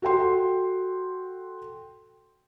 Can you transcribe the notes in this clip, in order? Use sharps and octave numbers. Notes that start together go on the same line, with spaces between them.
F#4 A4 G5 C6